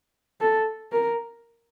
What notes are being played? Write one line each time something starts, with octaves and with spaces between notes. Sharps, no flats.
A4
A#4